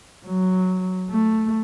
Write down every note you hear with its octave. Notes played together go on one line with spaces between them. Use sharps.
F#3
A3